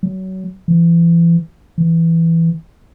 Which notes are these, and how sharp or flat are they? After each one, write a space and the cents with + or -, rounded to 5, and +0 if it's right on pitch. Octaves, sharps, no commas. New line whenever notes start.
F#3 +25
E3 +35
E3 +5